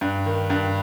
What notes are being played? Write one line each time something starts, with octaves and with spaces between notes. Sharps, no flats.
G2
D#3
G2